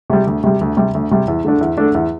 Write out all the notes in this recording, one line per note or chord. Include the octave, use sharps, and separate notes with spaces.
C3 G3
D2
C3 G3
D2
C3 G3
D2
C3 G3
E2
D3 A3 D4
E2
D3 A3 D4
E2